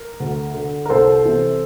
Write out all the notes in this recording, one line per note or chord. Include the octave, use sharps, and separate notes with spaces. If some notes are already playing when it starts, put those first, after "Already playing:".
Already playing: A#4
D2
D3
A#4
C2 A4 C5
C3 E3